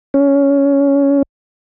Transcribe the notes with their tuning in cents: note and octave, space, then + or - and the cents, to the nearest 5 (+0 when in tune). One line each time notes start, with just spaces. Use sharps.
C#4 +15